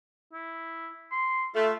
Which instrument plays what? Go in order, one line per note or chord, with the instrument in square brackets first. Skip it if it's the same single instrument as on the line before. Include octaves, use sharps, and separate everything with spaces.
[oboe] E4
C6
[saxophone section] A3 [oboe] F4